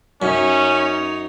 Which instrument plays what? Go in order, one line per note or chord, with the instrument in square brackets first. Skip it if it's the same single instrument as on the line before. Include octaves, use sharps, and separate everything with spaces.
[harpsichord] F#2 [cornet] C#4 [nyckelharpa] D#4 C#5